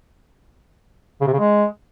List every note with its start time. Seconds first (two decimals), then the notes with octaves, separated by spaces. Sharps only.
1.21 C#3
1.27 C3
1.33 C#3
1.39 G#3